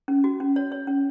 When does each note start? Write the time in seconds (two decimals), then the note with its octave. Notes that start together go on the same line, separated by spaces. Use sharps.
0.08 C#4
0.24 F#4
0.40 C#4
0.56 C#5
0.72 C#5
0.87 C#4